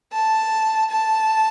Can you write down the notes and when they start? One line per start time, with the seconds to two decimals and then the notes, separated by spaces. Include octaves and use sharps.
0.12 A5
0.91 A5